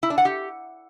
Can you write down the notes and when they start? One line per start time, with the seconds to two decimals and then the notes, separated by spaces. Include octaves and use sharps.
0.03 E4
0.10 D4
0.18 F#5
0.25 G4